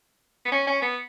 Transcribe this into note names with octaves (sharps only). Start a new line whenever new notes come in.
B3
C#4
C#4
B3